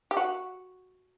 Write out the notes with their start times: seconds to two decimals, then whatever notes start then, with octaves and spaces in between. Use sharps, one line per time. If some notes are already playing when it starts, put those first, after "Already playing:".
0.11 G4
0.17 F#4